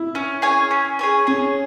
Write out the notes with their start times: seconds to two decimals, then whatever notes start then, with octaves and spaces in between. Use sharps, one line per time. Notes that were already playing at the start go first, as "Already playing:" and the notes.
Already playing: E4
0.15 C#4
0.42 G#4 C#5 G#5
0.71 C#4
0.99 G#4 C#5 G#5
1.27 C#4 G#4